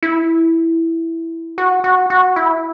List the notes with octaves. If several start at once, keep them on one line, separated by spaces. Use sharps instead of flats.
E4
F#4
F#4
F#4
E4